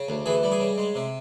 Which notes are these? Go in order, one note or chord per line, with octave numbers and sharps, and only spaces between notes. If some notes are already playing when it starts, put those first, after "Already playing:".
Already playing: C#3
D2
E3 G#4
G3
G#4
C#3
G#3
C3